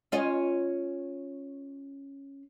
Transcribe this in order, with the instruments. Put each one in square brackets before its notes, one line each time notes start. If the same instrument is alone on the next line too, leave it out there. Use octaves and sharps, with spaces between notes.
[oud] C#4 F4 D#5